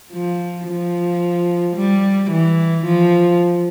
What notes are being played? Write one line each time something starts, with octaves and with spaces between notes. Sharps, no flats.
F3
F3
G3
E3
F3